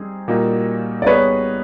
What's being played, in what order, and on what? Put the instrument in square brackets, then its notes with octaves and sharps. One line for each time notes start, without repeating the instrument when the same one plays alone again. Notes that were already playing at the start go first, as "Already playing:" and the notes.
Already playing: [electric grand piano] G3 C4 D#4 G#4
A#2 G3 A#3 D#4 F#4
[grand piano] D5
[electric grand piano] G3 B3 D#4 G#4 [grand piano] B4 C#5